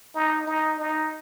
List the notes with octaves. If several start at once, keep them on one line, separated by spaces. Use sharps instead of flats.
D#4
D#4
D#4